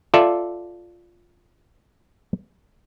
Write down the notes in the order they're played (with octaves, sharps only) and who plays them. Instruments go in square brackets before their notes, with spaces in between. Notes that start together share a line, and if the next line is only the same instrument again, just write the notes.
[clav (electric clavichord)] F4 A4 D5 E5